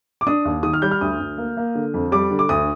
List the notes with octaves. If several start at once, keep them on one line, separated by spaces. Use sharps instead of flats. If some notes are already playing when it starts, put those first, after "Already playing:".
D6
D4 D#6
D#2
D#3 D#6
F6
G3 G6
F6
D2 D#6
D2
A#3
A#3
D3
F2
G3 D6
D3
D6
D2 D#6